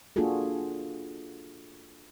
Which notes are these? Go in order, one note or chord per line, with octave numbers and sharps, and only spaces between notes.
A#3 D4 F4 F#4 G#4 A4